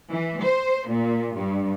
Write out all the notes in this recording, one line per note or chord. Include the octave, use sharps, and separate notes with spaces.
E3
C5
A#2
G2